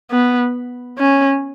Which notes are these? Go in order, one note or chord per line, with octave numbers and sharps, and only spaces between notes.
B3
C#4